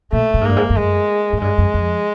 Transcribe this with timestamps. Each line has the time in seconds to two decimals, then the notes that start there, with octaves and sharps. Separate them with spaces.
0.13 A#2 A3
0.34 A2
0.41 G#2
0.45 G2 A#3
0.57 G#2
0.70 G2
0.77 F#2 G#3
1.33 G#2
1.41 G2 G#3
1.58 F#2
1.74 F2